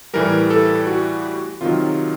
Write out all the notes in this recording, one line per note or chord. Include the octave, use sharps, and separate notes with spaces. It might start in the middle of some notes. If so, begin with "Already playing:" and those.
A2 E3 G3 A#4
A4
F#4
C3 D#3 F#3 F4